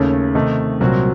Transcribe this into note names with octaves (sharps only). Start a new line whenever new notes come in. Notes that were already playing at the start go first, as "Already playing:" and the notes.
Already playing: D#2 C#3 A3 C#4
C3 D#3 A3 D#4
C2 A#2 F#3 C4 F#4